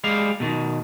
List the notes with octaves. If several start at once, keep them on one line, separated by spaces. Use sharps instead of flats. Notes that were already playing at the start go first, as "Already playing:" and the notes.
G3 G#3 F5
B2 D#3